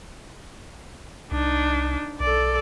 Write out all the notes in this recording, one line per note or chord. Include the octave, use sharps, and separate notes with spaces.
C2 D4 D#4
B1 A4 D5